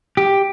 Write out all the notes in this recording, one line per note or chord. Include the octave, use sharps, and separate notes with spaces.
G4